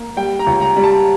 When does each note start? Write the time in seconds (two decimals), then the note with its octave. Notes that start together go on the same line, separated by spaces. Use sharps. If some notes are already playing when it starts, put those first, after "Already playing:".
Already playing: A#3
0.17 G3 G5
0.39 A#5
0.47 C#2
0.61 A#5
0.77 G3
0.84 A5